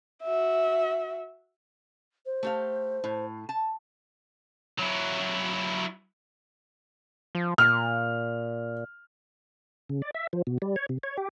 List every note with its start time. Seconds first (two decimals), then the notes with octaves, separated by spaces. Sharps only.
0.23 F#4 E5
2.25 C5
2.43 A3 G4 F5
3.04 A2
3.49 A5
4.78 F#3 E4
7.35 F3
7.58 A#2 F6
9.89 C#3
10.02 D5
10.15 E5
10.33 F3
10.47 B2
10.62 G3
10.76 C#5
10.89 C3
11.03 C#5
11.17 G4